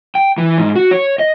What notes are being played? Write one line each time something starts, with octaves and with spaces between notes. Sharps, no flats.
G5
E3
G#2
F#4
C#5
D#5